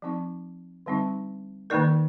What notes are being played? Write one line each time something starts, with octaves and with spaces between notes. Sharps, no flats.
F3 C4 D#4
D3 G3 C4 D#4
D#3 A#3 D#4 A#4 D5